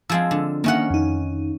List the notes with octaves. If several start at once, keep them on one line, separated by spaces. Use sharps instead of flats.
F3 G#3 C4 E6
D3
D#3 A#3 C#4 E5 F#5
F2 D#4